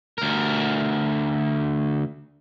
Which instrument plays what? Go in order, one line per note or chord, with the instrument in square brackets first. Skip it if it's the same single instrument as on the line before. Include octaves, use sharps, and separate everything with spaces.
[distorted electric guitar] D2 A#4